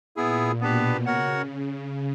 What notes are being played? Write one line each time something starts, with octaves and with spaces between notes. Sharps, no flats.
A#2 B3 E4 G#4
B2 B3 D4 G4 B4
C#3 F#4 A#4 C#5 F#5